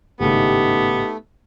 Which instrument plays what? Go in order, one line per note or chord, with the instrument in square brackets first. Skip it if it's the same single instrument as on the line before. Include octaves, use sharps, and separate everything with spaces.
[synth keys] G#1 A2 C#3 [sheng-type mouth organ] A3 [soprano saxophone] B3 [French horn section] D#4 G4